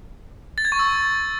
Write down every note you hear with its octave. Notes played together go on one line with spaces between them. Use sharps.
A6
G#6
C#6
E6